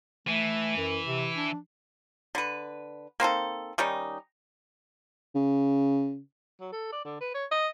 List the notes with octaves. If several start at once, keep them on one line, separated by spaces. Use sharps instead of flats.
E3 A3
F#2
C3
D4
D3 B4
A#3 C4 D#4 A4
D#3 G3 C#4 D#4
C#3
F#3
A4
D5
D3
B4
C#5
D#5